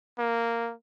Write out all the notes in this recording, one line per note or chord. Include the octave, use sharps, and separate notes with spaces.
A#3